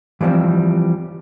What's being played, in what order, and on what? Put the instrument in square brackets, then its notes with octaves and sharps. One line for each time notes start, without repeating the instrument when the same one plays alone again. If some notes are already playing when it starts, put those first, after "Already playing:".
[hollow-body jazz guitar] E3 F3 G3 A#3 C4